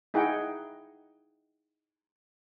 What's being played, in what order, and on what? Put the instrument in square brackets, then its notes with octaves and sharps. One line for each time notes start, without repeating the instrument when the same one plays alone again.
[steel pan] D#4 E4 G#4 D#5 F#5 G5